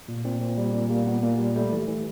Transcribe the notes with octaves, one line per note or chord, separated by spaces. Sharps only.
A#2
A#2 C4
A#2
G3
A#2
G3 A#3
A#2 B3
A#2 A#3
G3
G3 A3
E3
E3